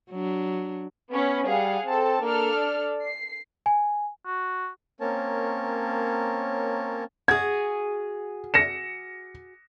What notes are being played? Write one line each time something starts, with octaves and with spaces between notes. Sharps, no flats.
F#3 D4
B3 C#4 B5
G3 G#4 F5 F#5
C4 A4 A5
A#3 D4 A4 F6
D5
C7
G#5
F#4
A#3 C4 C#4 A#4 C#5 A5
F#4 G#4 G#6
A#6 C#7 E7